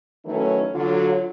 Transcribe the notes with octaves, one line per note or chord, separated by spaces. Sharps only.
D#3 E3 F#3 A3 C#4 D#4
D3 F#3 F4